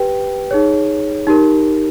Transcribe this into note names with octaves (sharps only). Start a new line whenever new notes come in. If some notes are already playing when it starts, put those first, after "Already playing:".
Already playing: G4 B4 G5
D#4 G#4 C#5
D#4 G4 A#4